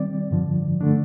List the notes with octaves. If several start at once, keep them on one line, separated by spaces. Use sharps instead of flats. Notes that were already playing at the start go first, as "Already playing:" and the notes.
Already playing: D#3 G3 C4 D5
G2 D3 F3
D3 A3 D4